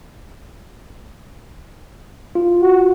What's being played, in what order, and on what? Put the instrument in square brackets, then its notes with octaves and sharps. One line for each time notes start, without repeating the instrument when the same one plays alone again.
[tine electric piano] F4
[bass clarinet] F#4